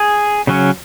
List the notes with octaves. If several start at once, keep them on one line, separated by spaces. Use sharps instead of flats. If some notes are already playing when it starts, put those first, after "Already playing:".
Already playing: G#4
C#3 F#3 C#4